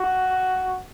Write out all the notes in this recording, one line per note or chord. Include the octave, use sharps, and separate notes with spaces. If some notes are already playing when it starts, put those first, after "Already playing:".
Already playing: F#4